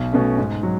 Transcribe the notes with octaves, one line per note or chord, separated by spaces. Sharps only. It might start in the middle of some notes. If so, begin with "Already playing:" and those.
Already playing: B1
B2 A3 C#4
G#2
F#3